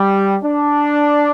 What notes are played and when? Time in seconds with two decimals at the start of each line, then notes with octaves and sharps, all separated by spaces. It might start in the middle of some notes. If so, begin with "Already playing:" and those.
Already playing: G3
0.43 D4